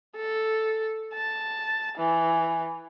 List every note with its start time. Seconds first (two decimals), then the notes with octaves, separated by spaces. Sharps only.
0.16 A4
1.14 A5
1.98 E3